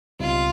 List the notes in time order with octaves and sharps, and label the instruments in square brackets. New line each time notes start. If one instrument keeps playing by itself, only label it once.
[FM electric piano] C#2 B2 G3 C4 D#4 [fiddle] F4